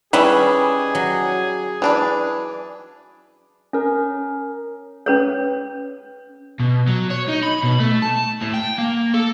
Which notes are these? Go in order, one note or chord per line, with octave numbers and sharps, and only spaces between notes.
D#3 E3 G3 C#4 E4 G#4 B4
F#3
E3 D4 B4
C#4 A#4
C#4 B4 C#5
B2
F#3
C#5
D#4
B5
B2
A3
A5
A2
G5
A#3
A4